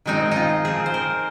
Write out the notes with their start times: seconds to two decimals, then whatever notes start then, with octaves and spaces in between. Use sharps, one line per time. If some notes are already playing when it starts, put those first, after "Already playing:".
0.06 D#3 G#3 C4 D#4
0.31 D#4 F4
0.65 F3 C4 G#4
0.86 C5
0.94 A#4